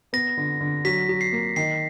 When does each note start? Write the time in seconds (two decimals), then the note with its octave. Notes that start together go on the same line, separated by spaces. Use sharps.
0.13 B3 A#6
0.37 D3
0.61 D3
0.85 F#3 B6
1.09 F#3
1.21 C7
1.33 A#3
1.56 D#3 C7